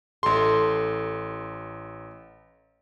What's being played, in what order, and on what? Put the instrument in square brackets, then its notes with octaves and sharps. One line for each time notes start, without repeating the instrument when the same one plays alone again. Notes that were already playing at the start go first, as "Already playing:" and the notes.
[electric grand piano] A1 C6 [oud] A4 E5